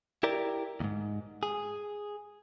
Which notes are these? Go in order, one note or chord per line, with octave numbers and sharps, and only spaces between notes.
E4 G4 A#4 D5
D#2 G#2
G#4